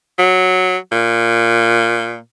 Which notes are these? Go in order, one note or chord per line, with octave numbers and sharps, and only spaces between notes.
F#3
A#2